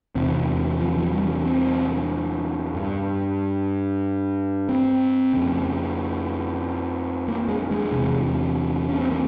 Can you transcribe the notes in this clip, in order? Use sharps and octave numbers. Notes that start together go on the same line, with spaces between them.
E2 C3 C4
F3
F3
G3
C4
G2
C4
F2 C#3
A#3
G#3
G#3
E2 C3
C#4
C4
A#3